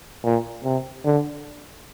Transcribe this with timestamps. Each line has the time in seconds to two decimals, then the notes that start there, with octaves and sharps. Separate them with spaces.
0.24 A#2
0.64 C3
1.05 D3